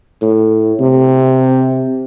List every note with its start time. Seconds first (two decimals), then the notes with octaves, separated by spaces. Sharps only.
0.22 A2
0.80 C3